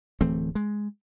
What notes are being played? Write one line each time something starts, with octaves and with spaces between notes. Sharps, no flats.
D1 E3 A3 C4
G#3